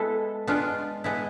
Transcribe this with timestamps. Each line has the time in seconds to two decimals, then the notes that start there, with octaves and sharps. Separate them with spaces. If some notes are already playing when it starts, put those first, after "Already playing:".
Already playing: G#3 B3 E4 A4
0.47 G#3 B3 D4 F4
1.04 G#3 B3 E4